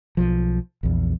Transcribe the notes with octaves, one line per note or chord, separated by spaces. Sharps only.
B1 F3
A#1 E2